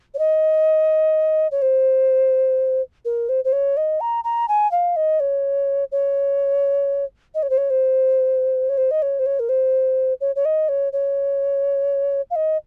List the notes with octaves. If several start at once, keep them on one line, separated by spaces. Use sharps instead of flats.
C#5
D#5
C#5
C5
A#4
C5
C5
C#5
D#5
A#5
A#5
G#5
F5
D#5
C#5
C#5
D#5
C#5
C5
C#5
C5
C#5
C5
D#5
C#5
C5
C#5
A#4
C5
C#5
C#5
D#5
C#5
C#5
F5
D#5